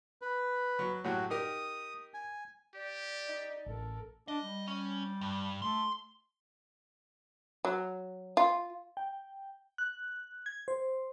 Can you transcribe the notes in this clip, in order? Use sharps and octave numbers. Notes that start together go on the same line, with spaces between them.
B4
F#3
A2 F#3 F#4 G4
D#4 G4 A#4 D#6
G#5
G4 D5
D#4 D#5
A1 A4 A#4
D4 D#5
G3
C#4
G2
A3 C6
F#3
F4
G5
F#6
G#6
C5